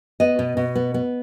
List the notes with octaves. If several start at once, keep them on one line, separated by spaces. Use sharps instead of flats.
B3 D#5
B2
B2
B3
B3